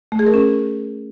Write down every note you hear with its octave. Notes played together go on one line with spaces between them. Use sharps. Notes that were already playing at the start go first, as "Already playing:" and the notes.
A3
G#4
A#4
C#4